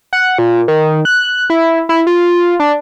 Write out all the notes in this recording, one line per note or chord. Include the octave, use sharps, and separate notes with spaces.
F#5
A#2
D#3
F#6
E4
E4
F4
D4